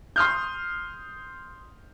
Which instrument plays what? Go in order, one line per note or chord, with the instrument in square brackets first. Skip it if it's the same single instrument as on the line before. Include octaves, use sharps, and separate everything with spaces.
[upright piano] C6 D#6 F6 G6